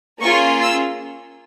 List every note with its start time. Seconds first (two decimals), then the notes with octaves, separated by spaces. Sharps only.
0.21 A#3 C#4 F4 G#4 C#6
0.61 E6